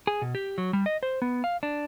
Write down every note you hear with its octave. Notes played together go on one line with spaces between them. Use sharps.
G#4
B2
G4
F#3
G3
D#5
C5
B3
F5
D4